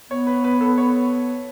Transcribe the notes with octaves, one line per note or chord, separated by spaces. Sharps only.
B3 C#5
B4
B4
A4
C#5